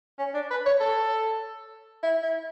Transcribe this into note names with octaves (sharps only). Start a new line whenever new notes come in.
C#4
D4
B4
C#5
A4
E4
E4